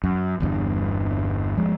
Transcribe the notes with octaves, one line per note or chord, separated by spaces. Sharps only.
F#2
G1 E2 G2
F3 G#3